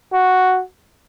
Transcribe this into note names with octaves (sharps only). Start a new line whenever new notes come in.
F#4